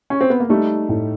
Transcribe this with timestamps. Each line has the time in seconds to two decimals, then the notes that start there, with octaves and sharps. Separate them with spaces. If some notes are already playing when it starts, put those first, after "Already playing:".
0.10 C#4
0.21 C4
0.30 B3
0.40 A#3
0.49 G3 A3 D#4
0.89 A2